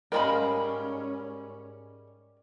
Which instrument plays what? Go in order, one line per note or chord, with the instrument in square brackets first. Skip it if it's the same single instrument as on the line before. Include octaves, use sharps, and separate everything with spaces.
[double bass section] G#2 C#4 [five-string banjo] G3 G#3 F5 [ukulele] A#4 B5